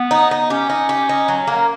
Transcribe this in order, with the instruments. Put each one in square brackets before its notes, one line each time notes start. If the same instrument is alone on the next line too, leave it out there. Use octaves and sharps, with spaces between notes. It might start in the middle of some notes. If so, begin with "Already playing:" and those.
Already playing: [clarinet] B3
[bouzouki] D#4
D#4
[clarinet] C#4 [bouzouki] G4
[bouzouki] D#4
G4
D#4
F#3
A#3